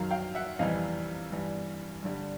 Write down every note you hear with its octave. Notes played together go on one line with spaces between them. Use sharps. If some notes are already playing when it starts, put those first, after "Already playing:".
Already playing: F#2 D#3 F#3 F5
F5 G5
E5 F#5
F2 C3 E3 G3 D#5 F5
G2 E3 G3
G2 D3 G3